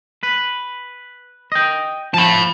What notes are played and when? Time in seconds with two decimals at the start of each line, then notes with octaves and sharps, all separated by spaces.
0.23 B4
1.52 D#5 G5
2.14 F3 A5 B5